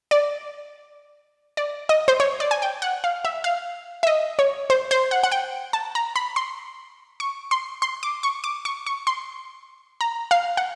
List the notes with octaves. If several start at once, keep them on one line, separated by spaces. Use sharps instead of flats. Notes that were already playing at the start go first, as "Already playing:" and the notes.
D5
D5
D#5
C5
C#5
D5
G#5
G5
F#5
F5
E5
F5
E5
D#5
C#5
C5
C5
F#5
F#5
G5
A5
A#5
B5
C6
C#6
C6
C6
D6
C#6
D6
C#6
C#6
C6
A#5
F5
F#5